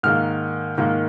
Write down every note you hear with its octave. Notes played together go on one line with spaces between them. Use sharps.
G#2 D#3 A#3 F6
G#2 D#3 A#3